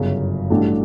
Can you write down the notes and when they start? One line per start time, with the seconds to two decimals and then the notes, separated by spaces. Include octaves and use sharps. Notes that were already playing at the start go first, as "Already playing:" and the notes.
Already playing: G1 F#2 C#3
0.50 A1 G2 F#3 A3 D4